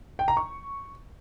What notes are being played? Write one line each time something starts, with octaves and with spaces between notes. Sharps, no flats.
G5
A#5
C#6